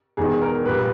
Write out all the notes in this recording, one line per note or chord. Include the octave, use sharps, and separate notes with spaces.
E1 E2 D#3 G#4
A#4
A#1 A#2 G3 B4